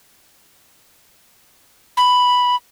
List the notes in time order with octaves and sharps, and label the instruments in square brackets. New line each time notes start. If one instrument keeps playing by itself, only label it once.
[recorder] B5